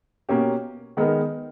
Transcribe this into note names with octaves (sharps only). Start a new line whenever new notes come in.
B2 A#3 C#4 G4
D#3 G#3 B3 D#4 A#4